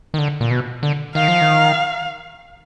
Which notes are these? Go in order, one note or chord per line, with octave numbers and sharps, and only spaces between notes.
D#3
D3
A#2
B2
D3
D#3 F5
F3
D#3